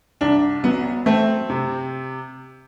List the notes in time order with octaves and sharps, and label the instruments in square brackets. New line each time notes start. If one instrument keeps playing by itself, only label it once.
[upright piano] C2 [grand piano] D4
[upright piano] F#3 [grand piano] B3
[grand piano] A3 [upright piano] C4
[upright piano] C3